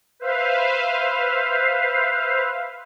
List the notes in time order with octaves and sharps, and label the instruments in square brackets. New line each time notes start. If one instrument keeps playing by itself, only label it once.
[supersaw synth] B4 C5 E5 F5